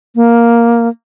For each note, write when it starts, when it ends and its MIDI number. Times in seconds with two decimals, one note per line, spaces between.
0.16 0.88 58